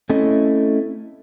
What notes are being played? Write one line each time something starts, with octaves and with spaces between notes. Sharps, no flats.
A3 C4 C#4 E4 A4 D#5